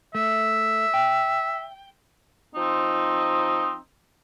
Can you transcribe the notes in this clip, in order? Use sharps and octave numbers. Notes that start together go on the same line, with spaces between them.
A3 E5
G5
F3 C4 D#4